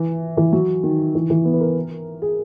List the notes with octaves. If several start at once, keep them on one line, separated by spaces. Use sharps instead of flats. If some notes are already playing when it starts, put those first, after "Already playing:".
Already playing: E3
E3
F#3
D#3
E3
E3
B3
B4
A#4
G#4